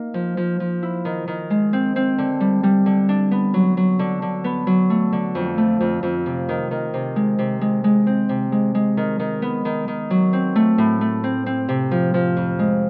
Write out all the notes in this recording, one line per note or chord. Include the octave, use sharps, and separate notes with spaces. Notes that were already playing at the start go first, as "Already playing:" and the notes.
Already playing: A#3 D#4
F3
F3
F3
E4
D#3
D#3
G#3
C4
C4
D3
G3
G3
D3
D4
B3
F#3
F#3
D3
D3
B3
F#3
A3
D3
F2
A3
F2
F2
C3
D#3
D#3
C3
G#3
C3
G#3
G#3
C4
C3
G#3
G#3
D#3
D#3
B3
D#3
D#3
F#3
C4
A3
A2
A3
C4
C4
C3
F3
F3
F2
G#3